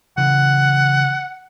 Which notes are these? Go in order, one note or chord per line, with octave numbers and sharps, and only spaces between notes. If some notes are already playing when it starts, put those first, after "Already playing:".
C#3 E3 F#5